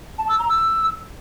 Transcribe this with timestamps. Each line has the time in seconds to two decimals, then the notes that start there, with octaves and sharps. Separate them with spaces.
0.19 A5
0.29 E6
0.39 A#5
0.49 E6